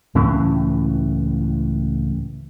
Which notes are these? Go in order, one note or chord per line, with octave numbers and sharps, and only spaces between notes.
C#2 A2 E3 C#4